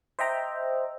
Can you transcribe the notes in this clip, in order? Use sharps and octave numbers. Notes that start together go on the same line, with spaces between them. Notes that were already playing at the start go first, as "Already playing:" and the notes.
C5 D#5 E5 G5 A#5